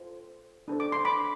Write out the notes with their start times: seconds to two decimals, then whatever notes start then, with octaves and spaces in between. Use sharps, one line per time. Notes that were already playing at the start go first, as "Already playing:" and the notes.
Already playing: F4 A4 C5
0.68 D4 A4 C5
0.80 D6
0.92 C6
1.05 B5 D6